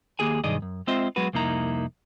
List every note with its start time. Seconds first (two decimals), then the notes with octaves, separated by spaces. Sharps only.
0.19 D#2 B2 A#3 G4 G#4 G#5
0.44 B1 G2 D#3 G#4 D5 D#5
0.62 F#2
0.87 G#3 C4 F4 C5 D#5 E5
1.16 F#3 G#3 B3 F#4 B4
1.33 C2 F2 A#3 D#4 E4 A#5